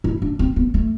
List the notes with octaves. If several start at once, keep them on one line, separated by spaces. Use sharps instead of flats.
E4
D4
C4
B3
A3